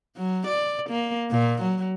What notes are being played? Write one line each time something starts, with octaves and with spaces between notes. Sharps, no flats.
F#3
D5
A#3
A#2
F#3